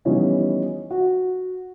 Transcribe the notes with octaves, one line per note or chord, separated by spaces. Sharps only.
E3 F3 G3 B3 C#4 D#4
F#4